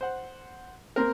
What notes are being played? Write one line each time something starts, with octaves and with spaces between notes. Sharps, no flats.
C5 F#5
A#3 C4 A#4